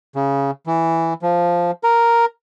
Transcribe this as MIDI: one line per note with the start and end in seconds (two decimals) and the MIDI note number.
0.16 0.51 49
0.67 1.14 52
1.22 1.71 53
1.84 2.25 70